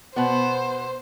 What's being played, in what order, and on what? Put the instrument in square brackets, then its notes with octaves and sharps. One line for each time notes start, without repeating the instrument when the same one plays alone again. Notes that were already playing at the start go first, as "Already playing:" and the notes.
[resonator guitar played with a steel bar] B2 B3 [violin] C5